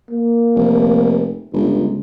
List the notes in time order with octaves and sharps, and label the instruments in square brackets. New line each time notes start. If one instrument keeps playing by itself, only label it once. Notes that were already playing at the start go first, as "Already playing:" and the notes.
[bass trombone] A#3
[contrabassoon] F1
[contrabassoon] G1 [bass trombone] C#2